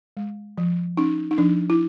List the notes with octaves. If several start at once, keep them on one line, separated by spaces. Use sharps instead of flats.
G#3
F3
C#4 D#4
D#4
F3 D4
E4